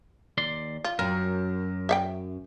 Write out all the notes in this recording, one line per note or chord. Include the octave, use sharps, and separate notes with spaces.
D#2 D5 C6
F4
F#2 A#4
E5 F5 G5